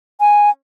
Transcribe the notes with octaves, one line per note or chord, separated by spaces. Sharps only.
G#5